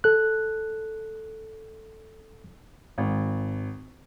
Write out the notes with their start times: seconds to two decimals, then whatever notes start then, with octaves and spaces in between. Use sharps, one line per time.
0.04 A4 F#6
2.98 G#1